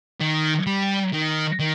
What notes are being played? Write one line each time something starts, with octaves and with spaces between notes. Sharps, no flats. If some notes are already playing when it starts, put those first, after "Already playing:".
D#3
G3
D#3
D#3